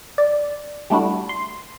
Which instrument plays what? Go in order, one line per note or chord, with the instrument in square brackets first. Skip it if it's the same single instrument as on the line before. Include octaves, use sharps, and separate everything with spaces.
[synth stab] D5
G3 A3 D4 E4 F#4
C6